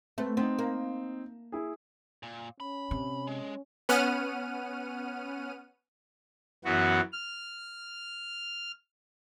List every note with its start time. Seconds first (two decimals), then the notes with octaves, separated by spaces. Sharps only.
0.18 A3 C4 B4
0.37 B3 C4 D#4
0.59 A#3
1.52 E4 G#4
2.23 A#2
2.60 C#4 B5
2.91 C3
3.27 G#3
3.89 B3 C#4 F#5 F6 D#7
6.65 F#2 E3 B3 F#4
7.13 F6